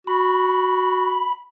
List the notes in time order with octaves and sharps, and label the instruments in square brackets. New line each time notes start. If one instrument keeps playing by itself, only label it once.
[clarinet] F#4 [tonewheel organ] B5